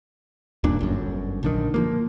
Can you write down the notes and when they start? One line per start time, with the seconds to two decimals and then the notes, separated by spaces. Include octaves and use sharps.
0.64 D#1 G2 A#2 D4
0.81 G1 F#2
1.43 A#1 D3 D#3
1.74 F3 F#3 A#3